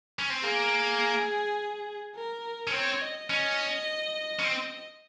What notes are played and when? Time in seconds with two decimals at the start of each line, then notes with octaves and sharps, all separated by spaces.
0.19 C#4
0.30 C4
0.44 A#3 G#4
2.15 A#4
2.67 C#4
2.72 C4 C#5
3.02 D#5
3.30 C#4 D#5
4.39 C#4
4.44 C4